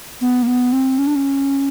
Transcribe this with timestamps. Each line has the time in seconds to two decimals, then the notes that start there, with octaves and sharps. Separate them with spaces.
0.21 B3
0.43 A#3
0.47 B3
0.72 C4
0.98 C#4
1.07 D4
1.15 C#4